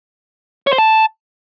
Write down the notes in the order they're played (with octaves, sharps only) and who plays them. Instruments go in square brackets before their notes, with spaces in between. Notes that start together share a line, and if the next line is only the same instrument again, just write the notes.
[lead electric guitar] C#5
C5
A5